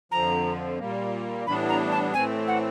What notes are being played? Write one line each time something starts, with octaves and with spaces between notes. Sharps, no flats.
F2 D3 F3 A#5
A#2 G3 A#3
A2 E3 G3 B3 D4 B5
A#5
A5
A2 E3 A3 C4 G#5
F#5